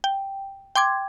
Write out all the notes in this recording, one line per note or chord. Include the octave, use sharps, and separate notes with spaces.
G5
G5 C6 D6 G#6